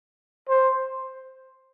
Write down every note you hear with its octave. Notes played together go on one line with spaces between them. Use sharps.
C5